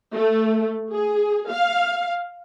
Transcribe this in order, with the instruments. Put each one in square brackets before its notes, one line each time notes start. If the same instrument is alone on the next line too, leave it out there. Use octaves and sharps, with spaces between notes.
[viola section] A3
G#4
F5